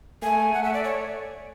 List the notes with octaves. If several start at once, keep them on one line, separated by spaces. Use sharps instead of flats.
A3 G#5
A3 F#5
E5
D5
C#5